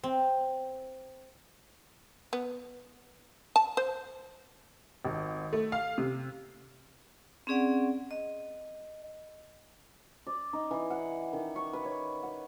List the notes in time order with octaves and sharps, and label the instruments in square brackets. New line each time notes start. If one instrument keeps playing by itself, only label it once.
[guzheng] C4
[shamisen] B3
A5
C5
[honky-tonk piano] G#1
A3
F5
C3
[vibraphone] C4 C#4 G#4 D5 F#5
D#5
[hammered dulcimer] D5
D#4
E3
F#5
D#3
C#6
B4
C#5
F#5